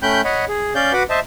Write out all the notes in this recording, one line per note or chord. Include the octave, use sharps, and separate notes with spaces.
A3 C#4 G5 B5 F#6 G6
C#5 D#5 F#5 B5
G#4
C#4 D5 F5 G6
F#4 B4 F#5 B5 D6
C5 D#5 E5 A5